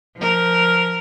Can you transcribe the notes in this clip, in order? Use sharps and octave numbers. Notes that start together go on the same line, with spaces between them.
F3 A#4